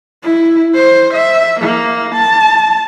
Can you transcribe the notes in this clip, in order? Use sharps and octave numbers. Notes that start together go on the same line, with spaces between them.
E4
C5
E5
A#3
A5